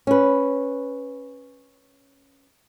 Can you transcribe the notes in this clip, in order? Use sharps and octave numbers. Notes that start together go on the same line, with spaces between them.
C#4 B4